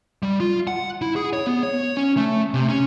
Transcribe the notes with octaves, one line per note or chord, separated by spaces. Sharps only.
G3
F4
F#5
E4
G#4
C#5
B3
C#5
C#4
A3
C3
C#4